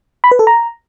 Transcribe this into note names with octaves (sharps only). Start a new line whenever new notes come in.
B5
B4
A4
A#5